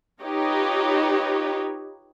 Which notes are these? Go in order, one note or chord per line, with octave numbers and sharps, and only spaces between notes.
D#4 F4 G4 B4 C#5 D#5